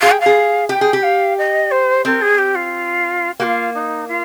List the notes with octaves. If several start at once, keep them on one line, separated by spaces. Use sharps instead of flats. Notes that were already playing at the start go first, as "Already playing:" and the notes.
G#4 F5
G5
F5
G#4
G4 G5
G#4
G4
F5
D#5
C5
C4 A#4
G#4
G4
F4
A#3 F4 G4
D#4
F4